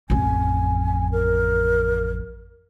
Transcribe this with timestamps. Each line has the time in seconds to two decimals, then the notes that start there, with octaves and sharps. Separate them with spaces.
0.10 A1 F2 G#5
1.12 A#4